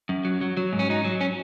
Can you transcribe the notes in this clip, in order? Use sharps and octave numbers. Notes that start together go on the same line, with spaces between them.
F#2
F#3
F#3
F#3
G#2
C#4
F#3 D#4
F#3
C#4